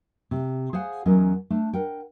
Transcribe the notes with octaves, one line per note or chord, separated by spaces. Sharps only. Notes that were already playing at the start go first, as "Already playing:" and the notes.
C3
G#4 C5 F5 F#5 G#5
E2 F#3 C#4 A#4 D#5
A3 D4
A#4 F#5 G5